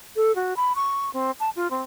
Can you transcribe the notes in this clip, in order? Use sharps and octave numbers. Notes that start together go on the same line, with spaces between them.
A4
F#4
B5
C#6
C4
A5
F4
C4